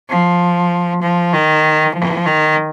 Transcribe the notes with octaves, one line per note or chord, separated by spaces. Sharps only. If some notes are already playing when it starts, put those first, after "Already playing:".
F3
F3
D#3
F3
D#3